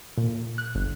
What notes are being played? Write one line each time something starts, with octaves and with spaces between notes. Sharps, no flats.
A#2
F#6
G1